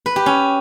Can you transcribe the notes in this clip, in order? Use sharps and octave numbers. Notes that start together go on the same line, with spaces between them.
B4
G4
C#4